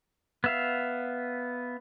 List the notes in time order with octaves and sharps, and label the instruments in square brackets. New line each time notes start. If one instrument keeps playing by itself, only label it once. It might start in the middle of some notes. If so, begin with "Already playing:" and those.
[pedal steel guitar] B3 E5 F5